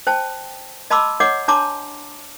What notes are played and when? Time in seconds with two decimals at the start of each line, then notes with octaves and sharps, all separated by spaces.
0.07 C5 G5 A5
0.90 D#5 A5 B5 C6 D6 E6
1.20 C#5 D#5 F#5 D6
1.48 D4 C#5 A5 A#5 C6 D6